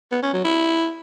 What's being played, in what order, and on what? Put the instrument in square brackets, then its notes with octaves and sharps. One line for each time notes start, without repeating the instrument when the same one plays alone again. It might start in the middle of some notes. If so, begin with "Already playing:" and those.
[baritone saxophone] B3
C#4
F#3
E4